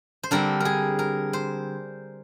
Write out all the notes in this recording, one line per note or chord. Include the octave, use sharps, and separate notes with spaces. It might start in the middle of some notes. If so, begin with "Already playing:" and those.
C5
D3 G3 C4 A#4
G#4 A#4
A#4
C5